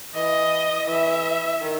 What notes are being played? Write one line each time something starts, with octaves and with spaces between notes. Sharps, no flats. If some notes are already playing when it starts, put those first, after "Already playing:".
E3 D#5
E3 E5
D#3